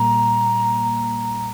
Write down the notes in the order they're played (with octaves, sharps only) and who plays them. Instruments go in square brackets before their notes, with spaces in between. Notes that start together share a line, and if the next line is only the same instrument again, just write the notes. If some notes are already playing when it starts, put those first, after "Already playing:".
Already playing: [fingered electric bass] A#2 G3 A#3 [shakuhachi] A#5